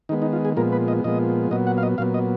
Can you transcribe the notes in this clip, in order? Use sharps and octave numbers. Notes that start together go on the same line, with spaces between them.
D#3 G#3 B3 D#4
D#4
F4
G#4
A#2 F3 G#3 B3 A#4
B4
D#5
A#2 F3 G#3 B3 D#5
A#2 F#3 B3 D#5
F#5
F5
D#5
A#2 F#3 B3 F5
D#5